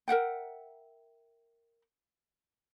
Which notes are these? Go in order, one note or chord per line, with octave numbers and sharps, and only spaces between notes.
A#4 E5 F#5 G5